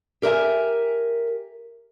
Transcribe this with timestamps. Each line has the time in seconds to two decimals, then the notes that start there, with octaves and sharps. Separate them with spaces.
0.22 G4 A#4 B4 E5 G#5